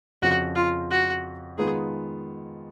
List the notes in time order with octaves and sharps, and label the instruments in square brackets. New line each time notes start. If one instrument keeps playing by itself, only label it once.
[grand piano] F2 C#3 F3 [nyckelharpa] F#4
[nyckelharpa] F4
F#4
[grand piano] D#3 G#3 B3 F4 [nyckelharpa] G#4